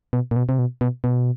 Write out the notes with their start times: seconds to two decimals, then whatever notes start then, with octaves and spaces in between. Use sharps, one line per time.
0.13 B2
0.31 A#2
0.36 B2
0.49 C3
0.59 B2
0.81 B2
1.04 B2